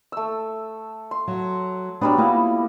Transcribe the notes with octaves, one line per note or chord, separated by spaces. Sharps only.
A3 E6
C6
F#3
F#3 G3 B3 D4
A#3 B3 E4 F4